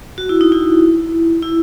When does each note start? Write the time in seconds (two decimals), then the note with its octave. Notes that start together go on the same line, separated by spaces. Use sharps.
0.18 F#4
0.29 E4
0.41 D#4
0.52 E4
1.42 E4